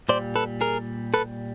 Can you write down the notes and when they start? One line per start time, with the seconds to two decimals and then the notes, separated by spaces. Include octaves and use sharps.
0.09 A#2 G3 C5 D5
0.36 A4 B4
0.61 G#4 A#4
1.14 A4 B4